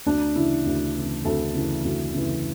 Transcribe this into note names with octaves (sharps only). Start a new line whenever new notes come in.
D2 D4
C#3 E3 E4
D2
C#3 E3
D2 A4
C#3 E3
D2
C#3 E3